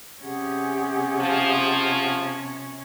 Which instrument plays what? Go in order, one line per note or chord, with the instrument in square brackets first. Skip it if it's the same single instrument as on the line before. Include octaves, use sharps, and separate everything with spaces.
[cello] C3 C#4 [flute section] G4 G#4 F#5
[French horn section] F3